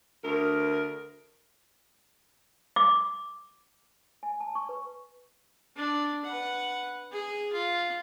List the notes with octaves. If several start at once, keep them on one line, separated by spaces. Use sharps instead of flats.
D2 A#4
D6
G#5
A5
C#6
B4
D4
B4 F#5
G#4
F4